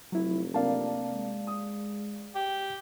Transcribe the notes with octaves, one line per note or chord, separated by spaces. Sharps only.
F1 F#3 E4
C3 A#3 D4 D5 F5 A5
G#3
D#6
G4